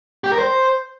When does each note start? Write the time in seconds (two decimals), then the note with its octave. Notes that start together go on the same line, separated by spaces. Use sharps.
0.24 G4
0.31 A#4
0.39 C5